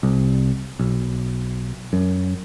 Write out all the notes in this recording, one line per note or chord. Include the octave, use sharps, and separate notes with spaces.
C2
B1
F#2